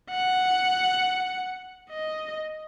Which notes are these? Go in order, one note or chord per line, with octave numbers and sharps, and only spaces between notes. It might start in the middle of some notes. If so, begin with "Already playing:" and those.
F#5
D#5